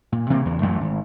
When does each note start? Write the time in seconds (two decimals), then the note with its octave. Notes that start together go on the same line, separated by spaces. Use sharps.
0.12 A#2
0.30 C3 D#3 A3 A#3
0.41 E2 C#3
0.62 A1 F#2 A3
0.81 G#1